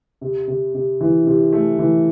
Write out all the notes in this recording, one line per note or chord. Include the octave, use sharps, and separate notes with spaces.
C3
C3
C3
E3
C3
A3
E3